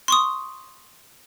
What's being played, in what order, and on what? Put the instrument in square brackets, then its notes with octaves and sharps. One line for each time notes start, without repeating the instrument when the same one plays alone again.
[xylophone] C6 C#6 D#6